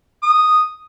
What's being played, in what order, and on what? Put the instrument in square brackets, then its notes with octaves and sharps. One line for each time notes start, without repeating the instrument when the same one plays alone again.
[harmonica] D#6